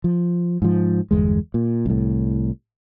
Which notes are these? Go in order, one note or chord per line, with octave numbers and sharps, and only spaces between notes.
F3
G#2 F3
G1 E2 G#3
A#2
C2 A2